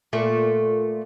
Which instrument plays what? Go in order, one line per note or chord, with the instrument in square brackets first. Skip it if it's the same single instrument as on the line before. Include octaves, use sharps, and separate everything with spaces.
[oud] A#2 A3